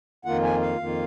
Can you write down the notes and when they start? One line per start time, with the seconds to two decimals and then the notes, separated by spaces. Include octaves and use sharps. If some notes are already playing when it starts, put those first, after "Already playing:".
0.25 F2 D#3 A#3 F4 F#5
0.43 G#5
0.61 F5
0.78 F2 D#3 A#3 F4